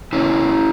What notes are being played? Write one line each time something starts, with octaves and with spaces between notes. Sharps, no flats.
C#3 E3 B3 C#4 E4